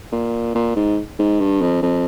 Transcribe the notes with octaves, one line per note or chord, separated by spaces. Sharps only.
A#2
A#2
G#2
G#2
G2
F2
F2